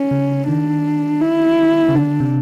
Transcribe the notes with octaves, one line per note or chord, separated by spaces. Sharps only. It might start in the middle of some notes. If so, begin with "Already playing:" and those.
Already playing: C#4
C#3
D#3 D4
E4
C#3
D3 D4
C3